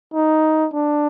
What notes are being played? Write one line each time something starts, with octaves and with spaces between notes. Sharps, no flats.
D#4
D4